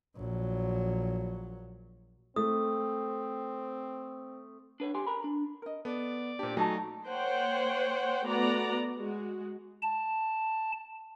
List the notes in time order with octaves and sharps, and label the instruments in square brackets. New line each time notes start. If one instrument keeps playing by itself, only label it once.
[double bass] A#1 F#3
[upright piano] A3 [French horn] C4 [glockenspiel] D#6
[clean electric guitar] D4 B4 C#5
G4 G#5 C6
A#4 A#5 B5
D4
[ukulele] A#4 D#5
[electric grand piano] B3 [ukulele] A4 [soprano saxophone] D5
[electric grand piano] A#2 G4 [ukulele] D4 C5
[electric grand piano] F#3 A3 F#4 [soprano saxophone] D#4 [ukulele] G#5 A5
[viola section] A#3 C5 C#5 F#5 G5
A3 B3 F#4 D5 A#5
G#3 F#4
[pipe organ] A5